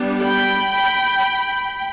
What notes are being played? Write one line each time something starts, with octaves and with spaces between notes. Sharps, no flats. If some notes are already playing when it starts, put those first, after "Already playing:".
Already playing: G3 B3 D4
G5 B5